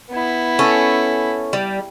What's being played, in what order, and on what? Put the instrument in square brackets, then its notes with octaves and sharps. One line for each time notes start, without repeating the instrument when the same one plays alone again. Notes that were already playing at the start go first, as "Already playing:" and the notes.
[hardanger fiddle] B3 E4
[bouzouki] C#4 A4
G3